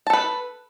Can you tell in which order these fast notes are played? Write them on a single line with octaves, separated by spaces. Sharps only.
A5 A4 B4